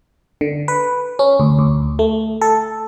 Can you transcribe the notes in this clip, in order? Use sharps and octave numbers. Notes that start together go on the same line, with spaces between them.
D3
B4
C#4
D2
D2
A3
A4